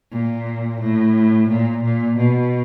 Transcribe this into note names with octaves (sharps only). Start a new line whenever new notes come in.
A#2
A2
A#2
A#2
B2